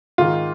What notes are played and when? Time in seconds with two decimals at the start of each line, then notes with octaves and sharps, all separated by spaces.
0.18 G#2 D#3 F4